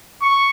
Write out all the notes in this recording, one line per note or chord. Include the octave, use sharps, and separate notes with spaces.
C#6